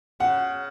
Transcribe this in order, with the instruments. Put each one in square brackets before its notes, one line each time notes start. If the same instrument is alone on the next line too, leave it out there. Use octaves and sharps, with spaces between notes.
[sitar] C#3 [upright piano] F#5